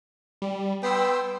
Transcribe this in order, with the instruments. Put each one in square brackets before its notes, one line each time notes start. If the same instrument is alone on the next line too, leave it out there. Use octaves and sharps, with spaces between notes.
[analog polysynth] G3
[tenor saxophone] B3 [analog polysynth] G5 C6 E6